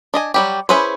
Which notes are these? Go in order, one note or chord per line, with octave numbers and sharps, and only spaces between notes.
D4 D#5 G#5
F#3 G3 G4
C#4 E4 G#4 B4 C5